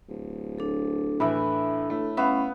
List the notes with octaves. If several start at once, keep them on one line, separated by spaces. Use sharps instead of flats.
D1
D4 A4
A2 E3 B4 E5
A2 A3
B3 C#4 E5 F5